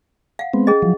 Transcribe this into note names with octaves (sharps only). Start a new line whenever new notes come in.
F5 F#5
G#3 B3 C4
C#4 G#4 D#5
F3 F#3